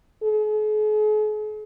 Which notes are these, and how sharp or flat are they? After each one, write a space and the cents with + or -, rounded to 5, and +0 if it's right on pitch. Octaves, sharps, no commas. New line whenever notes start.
G#4 +45